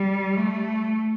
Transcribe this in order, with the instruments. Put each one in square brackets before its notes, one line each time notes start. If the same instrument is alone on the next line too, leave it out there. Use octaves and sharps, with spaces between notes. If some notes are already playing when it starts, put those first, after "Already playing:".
Already playing: [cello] G3
A3